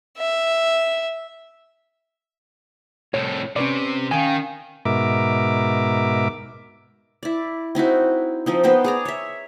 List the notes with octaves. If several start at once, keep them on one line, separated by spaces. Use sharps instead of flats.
E5
C2 A2 C#5
C3 C#4 B4 D5
D#3 C#4 F5 G5 G#5
G#2 B2 A#4 E5 D6
E4 D5
C4 D#4 E4 F#4
F3 C4 D#4
B3 D#4 C5 G5
G#4 D5 A#5
C#5 E5